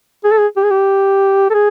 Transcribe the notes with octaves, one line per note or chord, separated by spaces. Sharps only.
G#4
A4
G#4
G4
G#4
G4
A4
G#4